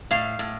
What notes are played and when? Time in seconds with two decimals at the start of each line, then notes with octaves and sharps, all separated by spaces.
0.11 A2 F5
0.39 A2